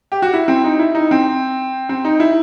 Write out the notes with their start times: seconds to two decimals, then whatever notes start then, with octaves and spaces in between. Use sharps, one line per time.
0.12 G4
0.22 F#4
0.33 E4
0.48 C4
0.64 D#4
0.79 E4
0.95 D#4
1.11 C4
1.89 C4
2.05 D#4
2.20 E4